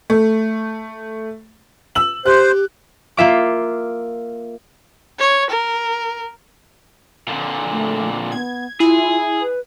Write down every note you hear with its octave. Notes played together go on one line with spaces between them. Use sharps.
A3
E6 F#7
G4 C5 F#6
A#3 F4 E5 D6
C#5
A#4
A#2 D3
A3
B3 G#6
E4 F4 G#4
B4